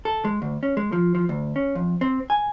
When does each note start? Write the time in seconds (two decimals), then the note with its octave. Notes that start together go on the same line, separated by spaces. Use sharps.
0.05 A4
0.25 G#3
0.42 D2
0.63 C#4
0.77 G#3
0.92 F3
1.15 F3
1.29 D2
1.56 C#4
1.75 F2
2.01 C4
2.30 G#5